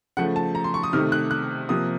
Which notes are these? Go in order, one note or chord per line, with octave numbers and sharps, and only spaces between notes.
C#3 F3 A3 F#5
A5
A#5
C6
C#6
D#6
C3 D#3 A3 F6
F#6
F#6
C3 F3 A#3 D#6